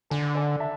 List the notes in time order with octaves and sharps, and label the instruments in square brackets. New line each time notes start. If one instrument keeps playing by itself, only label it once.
[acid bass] D3 [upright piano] A4
[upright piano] A4 D5
E5 A5